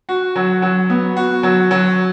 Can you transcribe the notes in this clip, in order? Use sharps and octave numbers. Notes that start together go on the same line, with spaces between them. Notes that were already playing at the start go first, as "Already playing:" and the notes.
F#4
F#3
F#3
B3
F#4
F#3
F#3